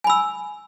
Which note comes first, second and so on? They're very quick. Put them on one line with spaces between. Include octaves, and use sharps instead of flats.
G#5 B5 E6